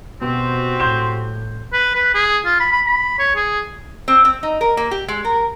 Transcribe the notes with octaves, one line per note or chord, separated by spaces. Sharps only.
B2 C4 F#4 G4 C5
A2 C6 G6 E7
B4
B4
G#4
F4
B5
B5
B5
C#5
G#4
C4
C4
D#4
A#4
A#3
G4
G#3
A#4